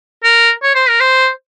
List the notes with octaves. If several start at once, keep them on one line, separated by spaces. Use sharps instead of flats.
A#4
C#5
C5
A#4
C5